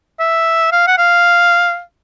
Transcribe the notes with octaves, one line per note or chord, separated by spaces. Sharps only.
E5
F5
F#5
F5